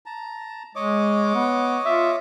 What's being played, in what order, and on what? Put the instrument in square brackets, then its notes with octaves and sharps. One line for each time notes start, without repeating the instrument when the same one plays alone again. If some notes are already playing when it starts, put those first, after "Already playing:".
[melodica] A5 A#5
[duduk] G#3 [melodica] C#5 D#5 D6
[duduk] B3
[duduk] F4 [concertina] E5